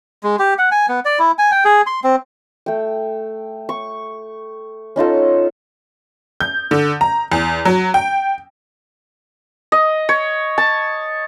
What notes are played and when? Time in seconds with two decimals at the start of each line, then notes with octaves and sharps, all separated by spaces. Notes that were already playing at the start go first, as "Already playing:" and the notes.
0.23 G#3
0.39 G4
0.59 F#5
0.71 G#5
0.89 B3
1.05 D5
1.19 E4
1.38 G#5
1.51 G5
1.65 G#4
1.87 C6
2.04 C4
2.66 A3 G5
3.69 C#6
4.96 C#4 D#4 F4 A4
6.40 G6
6.71 D3
7.01 A#5
7.32 E2
7.65 F#3
7.94 G5
9.72 D#5
10.09 C#5
10.58 A5